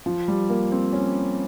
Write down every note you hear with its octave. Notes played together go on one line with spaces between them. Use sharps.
F3
G3
A#3
C4
C#4